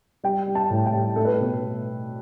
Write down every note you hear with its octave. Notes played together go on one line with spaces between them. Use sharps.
G3 G5
G3
A5
A2
G5
G3
A3 A4
B4
A4
B2